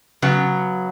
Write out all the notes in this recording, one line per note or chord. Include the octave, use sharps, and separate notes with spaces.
C#3 F#3 B3